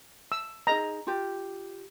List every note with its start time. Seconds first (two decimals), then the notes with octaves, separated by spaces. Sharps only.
0.32 E6
0.67 D#4 G#4 D#5 A#5
1.07 F4 G4